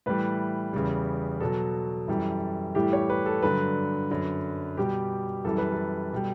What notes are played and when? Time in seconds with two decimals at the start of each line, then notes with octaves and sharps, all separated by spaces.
0.06 A2 E3 G3 B4
0.73 E2 C#3 E3 G3
1.40 B2 F#3 A4
2.08 F#2 E3 G3
2.75 A2 E3 G3 G4
2.93 C#5
3.10 B4
3.26 A4
3.43 G2 D3 F#3 B4
4.10 F#2 D3 F#3
4.77 B2 G3 G4
5.45 F#2 E3 G3 A4
5.58 B4
5.72 A4
6.12 B2 G3